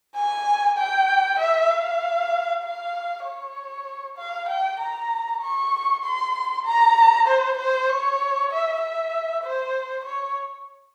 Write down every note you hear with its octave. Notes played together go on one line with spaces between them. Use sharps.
G#5
G5
E5
F5
F5
C#5
F5
G5
A#5
C#6
C6
A#5
C5
C5
C#5
E5
E5
C5
C#5